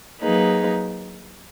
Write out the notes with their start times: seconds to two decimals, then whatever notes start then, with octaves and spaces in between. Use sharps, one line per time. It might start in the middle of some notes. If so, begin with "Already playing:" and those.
0.21 F#3 A#3 D#4 G#4 B4